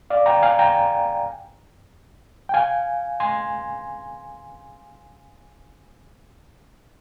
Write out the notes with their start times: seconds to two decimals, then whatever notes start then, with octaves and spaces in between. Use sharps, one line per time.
0.10 D5 F5
0.26 G5 A#5
0.42 F5 G#5
0.59 G5 A#5
2.49 G5
2.54 F5 G#5
3.20 G#5 C6